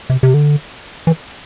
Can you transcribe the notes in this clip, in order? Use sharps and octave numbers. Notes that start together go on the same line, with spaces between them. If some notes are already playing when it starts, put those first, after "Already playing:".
C3
C3
D3
E3